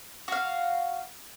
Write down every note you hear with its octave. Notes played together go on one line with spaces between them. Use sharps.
F#4 F5